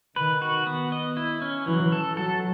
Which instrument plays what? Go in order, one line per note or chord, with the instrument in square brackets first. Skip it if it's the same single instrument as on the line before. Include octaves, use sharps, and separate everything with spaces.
[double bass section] D#3 [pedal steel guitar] B4
[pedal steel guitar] F#4
B3
D#5
E4
C#4
[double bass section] E3 [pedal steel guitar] F#3
[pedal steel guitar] A4
[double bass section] F#3 [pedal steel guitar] A4